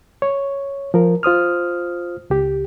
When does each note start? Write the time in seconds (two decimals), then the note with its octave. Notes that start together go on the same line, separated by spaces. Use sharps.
0.22 C#5
0.94 F3 A#4
1.23 F4 C5 D#6 F6
2.30 C#2 G4